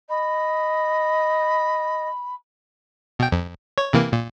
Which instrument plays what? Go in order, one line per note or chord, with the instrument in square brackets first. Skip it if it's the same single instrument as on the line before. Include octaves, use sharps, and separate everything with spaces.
[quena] D#5 [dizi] B5
[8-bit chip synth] B2 G5
F2
C#5
C3 E3 A#3
A#2